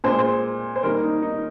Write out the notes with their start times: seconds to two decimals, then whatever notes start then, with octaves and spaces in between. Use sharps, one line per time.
0.04 A#2 G#3 C5
0.19 C5
0.76 C5
0.83 D#3 G3 A#3 A#4
1.02 D#4
1.22 D#4